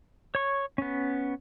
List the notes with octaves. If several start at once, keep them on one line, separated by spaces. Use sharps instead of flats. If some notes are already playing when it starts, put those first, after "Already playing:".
C#5 C#6
B3 C#4